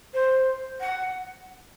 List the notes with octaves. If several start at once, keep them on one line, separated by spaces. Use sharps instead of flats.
C5
F#5